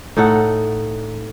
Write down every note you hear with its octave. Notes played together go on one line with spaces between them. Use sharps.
A2 D#4 A4 F#5